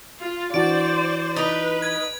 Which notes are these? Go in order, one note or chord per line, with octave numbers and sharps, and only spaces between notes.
F4
E3 D4 F#4 C5 D5 D7
D#4 B4
G#6